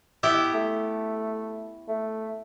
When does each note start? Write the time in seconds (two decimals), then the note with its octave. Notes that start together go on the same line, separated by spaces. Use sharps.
0.23 B3 E4 G4
0.54 A3
1.88 A3